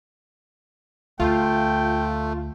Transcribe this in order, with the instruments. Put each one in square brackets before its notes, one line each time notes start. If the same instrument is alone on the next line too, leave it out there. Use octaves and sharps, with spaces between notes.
[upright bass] D2 [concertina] A3 [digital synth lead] F4 [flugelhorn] G5